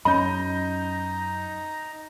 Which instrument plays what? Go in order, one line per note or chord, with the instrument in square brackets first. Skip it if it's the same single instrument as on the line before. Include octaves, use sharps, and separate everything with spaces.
[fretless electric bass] F#2 C#4 [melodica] D#4 A#5 [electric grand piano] D#5 G6 [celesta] B5